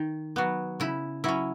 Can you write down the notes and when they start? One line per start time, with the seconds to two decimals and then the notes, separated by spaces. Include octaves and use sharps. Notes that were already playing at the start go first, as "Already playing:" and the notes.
Already playing: D#3
0.36 F#3 B3
0.80 C#3 E4
1.24 F#3 C#4 E4